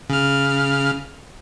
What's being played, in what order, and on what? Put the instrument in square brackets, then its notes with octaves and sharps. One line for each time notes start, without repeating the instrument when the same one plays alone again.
[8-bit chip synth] C#3 F6